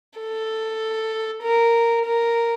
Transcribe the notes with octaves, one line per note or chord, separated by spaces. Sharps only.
A4
A#4
A#4